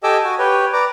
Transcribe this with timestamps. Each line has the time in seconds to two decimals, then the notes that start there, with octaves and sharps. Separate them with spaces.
0.03 G4 A4 D#5 G#5 D6 E6
0.24 F#4 G#5
0.39 G4 B4 C#5 G5
0.73 B4 D5 A#5 D6